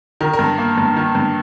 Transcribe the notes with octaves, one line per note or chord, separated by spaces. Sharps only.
D#3 A#4
A#4
G2
A#3
G2
D#3
G2